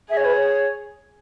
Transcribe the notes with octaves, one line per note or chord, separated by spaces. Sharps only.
G#4 E5
C#5
B4
C#5